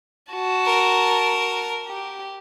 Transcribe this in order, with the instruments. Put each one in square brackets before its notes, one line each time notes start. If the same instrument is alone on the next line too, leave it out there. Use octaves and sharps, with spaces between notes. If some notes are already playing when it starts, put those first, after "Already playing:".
[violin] F#4 A5
[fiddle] A#4
[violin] G4